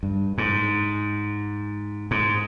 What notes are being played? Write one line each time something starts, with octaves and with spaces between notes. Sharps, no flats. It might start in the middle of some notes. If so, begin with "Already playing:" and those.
G2
G#2
G#2